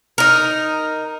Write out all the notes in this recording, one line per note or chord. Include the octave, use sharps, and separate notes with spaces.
D#4 A#4